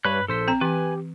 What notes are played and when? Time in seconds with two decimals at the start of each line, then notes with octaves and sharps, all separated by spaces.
0.05 G2 D4 B4 C#5 B5 F#6
0.28 A#1 A4 C5 B6
0.48 C4 A#5
0.61 E3 G4 B4 G#5